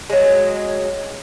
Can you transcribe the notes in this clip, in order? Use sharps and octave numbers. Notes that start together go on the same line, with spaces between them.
F#3 G#3